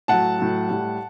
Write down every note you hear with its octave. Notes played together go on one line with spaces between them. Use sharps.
A2 F#3 F#5 A5
A2 F#3
A2 G3